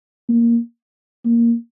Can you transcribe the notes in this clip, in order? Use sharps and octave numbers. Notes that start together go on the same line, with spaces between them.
A#3
A#3